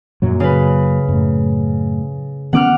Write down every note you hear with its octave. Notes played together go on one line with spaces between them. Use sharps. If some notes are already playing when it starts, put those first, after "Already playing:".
F#2 A#2 F#3
C#3 B4
F#2 A2
D#3 B3 C#4 F#5 D6 F6